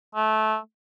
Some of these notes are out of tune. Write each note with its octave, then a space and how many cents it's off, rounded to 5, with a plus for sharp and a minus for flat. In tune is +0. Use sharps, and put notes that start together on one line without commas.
A3 -20